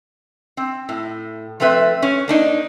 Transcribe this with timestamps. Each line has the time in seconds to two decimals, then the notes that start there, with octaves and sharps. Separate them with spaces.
0.57 C4
0.89 A2
1.60 F3 A3 C4 B4 E5
2.02 C#4
2.28 A#3 D4 D#4